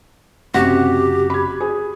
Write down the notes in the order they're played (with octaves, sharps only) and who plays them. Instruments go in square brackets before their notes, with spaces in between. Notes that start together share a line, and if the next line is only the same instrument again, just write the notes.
[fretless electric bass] F#1 C#4 [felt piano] C3 [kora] F#4 [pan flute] G4
[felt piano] B5 G#6
G#4